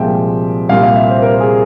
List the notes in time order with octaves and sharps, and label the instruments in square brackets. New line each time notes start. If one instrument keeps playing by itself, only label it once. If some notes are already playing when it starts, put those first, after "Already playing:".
Already playing: [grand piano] C2 A#2 F3 G#3 E5 G5
C2 A#2 G3 F5
F5
E5
C5
A#4
G#4